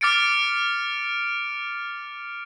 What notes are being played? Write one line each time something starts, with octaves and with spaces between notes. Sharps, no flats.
D6 F6 A6 C#7 D7